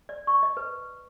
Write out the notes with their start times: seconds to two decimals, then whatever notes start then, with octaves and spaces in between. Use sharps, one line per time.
0.09 D5
0.27 C#6
0.43 D#5
0.57 B4